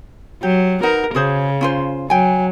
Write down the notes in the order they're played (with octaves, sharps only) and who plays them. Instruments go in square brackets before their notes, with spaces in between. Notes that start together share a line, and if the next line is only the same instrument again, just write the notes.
[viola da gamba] F#3 [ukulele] G4
[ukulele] D#4 B4 F#5 [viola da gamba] A#4
[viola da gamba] C#3 [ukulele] F#4 G#4 C5
[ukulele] C#4 F4 C5
[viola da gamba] F#3 [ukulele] G5 G#5